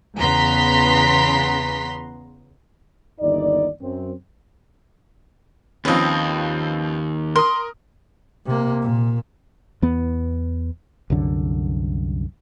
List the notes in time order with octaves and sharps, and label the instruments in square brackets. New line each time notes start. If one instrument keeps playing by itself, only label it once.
[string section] E2 C#3 B3 A#5 C6 B6
[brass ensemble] G1 D#2 D#4 D5
F#2 C4
[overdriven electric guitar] D#2 [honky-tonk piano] F3 C4 C#4 [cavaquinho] B4 D#5
[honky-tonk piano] A#4 D#6 [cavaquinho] C6
[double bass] C3 A#3
A#2
[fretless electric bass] E2 B3
C2 F#2 D3